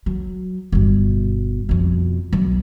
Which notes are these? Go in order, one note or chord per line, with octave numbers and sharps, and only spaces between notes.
F#3
G1 B2
F2 B2
B1